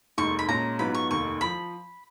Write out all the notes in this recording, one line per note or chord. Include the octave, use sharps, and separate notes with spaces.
F1 D#2 D#3 G#3 C#6
B5
A#2 G#3 C#4 A#5
G#2 F#3 B3 F4 B4 B5
C#6
F1 D#2 D#3 C#6
F3 B5